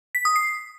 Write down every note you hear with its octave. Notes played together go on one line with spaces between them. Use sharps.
B6
D#6
C7